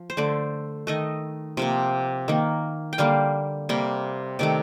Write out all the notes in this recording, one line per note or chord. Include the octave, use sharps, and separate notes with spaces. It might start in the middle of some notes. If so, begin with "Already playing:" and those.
Already playing: F3
C5
D3 A3 D5
D#3 A3 D#5
C3 F3 A#3
D#3 A#3
G5
D3 G3 A#3 F5
C3 G3 A#3
C3 D#3 A3 D5